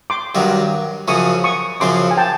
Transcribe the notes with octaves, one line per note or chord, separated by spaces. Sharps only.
C6 D6
G2 D#3 F#3
F#2 C#3 F3 C#6 D#6
C#6 D#6
F#2 C#3 F3 C6 D6
G#5
G5 A5